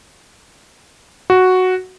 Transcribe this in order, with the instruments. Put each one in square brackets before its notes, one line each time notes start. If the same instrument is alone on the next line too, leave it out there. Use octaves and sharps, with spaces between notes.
[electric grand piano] F#4